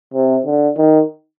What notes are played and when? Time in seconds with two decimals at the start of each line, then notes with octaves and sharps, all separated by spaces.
0.14 C3
0.46 D3
0.77 D#3